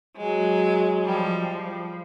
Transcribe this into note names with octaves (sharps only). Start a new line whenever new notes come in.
F#3 G#3
F3 G3
F3